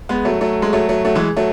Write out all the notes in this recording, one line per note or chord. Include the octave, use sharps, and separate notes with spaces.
G#3 B3
F#3 A3
F#3 A3
G#3
F#3 A3
F#3 A3
F#3 A3
E3 G#3
F#3 A3